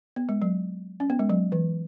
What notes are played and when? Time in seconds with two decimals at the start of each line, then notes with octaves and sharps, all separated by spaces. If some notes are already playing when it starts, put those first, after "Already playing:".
0.16 B3
0.29 G#3
0.42 F#3
1.00 C#4
1.10 B3
1.19 G#3
1.30 F#3
1.52 E3